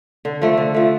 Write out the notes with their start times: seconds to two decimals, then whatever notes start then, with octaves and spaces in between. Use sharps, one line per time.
0.25 D3
0.42 F3 A3
0.57 D3
0.74 F3 A3